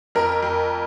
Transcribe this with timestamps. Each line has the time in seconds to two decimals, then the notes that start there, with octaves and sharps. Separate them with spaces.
0.15 F2 A#4
0.43 F2